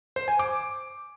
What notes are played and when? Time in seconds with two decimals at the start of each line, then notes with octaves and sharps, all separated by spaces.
0.16 C5
0.28 G#5
0.39 D6